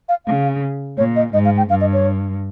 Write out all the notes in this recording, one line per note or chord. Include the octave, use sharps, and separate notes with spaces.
F5
C#3 F5
A#2 C#5
D#5
G#2 D#5
F5
G5
G2 F5
D#5
C#5